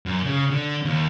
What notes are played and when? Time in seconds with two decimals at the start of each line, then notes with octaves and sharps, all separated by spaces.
0.06 F#2
0.25 C#3
0.50 D3
0.85 D#2